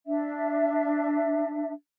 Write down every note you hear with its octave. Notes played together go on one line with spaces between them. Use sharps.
D4 E5